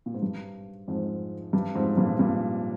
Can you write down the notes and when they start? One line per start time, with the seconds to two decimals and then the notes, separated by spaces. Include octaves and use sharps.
0.06 A#2
0.14 G#2
0.22 G2
0.88 F2 G#2
1.53 G2
1.75 F2 G#2
1.97 G2 A#2
2.19 G2 A#2